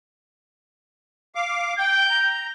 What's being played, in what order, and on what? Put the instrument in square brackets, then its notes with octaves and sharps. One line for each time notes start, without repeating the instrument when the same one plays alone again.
[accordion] F5 D6
[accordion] G5 [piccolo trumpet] G6
[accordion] A#5